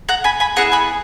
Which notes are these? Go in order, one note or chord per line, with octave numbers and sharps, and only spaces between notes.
F#5 A#5
G#5 B5
G#5 B5
B3 E4 G#4 F#5 A#5
G#5 B5